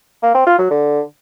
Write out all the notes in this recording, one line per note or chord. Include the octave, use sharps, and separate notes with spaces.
A#3
C4
F4
F#3
D3